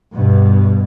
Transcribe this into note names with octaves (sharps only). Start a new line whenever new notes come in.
G2 B2